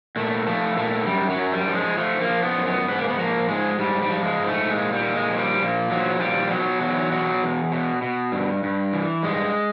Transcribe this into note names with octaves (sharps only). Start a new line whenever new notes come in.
A#2 A3
F3 A3
A#2 A3
F#2 G3
F#3
F#2
G3
F3
G#3
F3 A3
A#3
F3
B3
F#2
B3
G#2 B3
A#3
B3
F3 A#3
G#2 G#3
G#2 G3
G3
F3
G#3
G#2
A3
A#2 G#3
G3
A#2
G#3
F3
G3
A#2
F3 F#3
A#2 G3
B2 F#3
E2 F#3
B2 F#3
E2
B2
B2
G2
G2
E3
G2 G#3